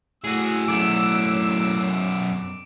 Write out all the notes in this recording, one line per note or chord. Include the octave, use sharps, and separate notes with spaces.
A2 F#4 G#4 E6
F#2 B3 D6 D7